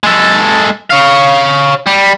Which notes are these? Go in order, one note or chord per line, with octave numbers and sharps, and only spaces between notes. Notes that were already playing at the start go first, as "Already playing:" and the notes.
G#3 A4
C#5 F5
G3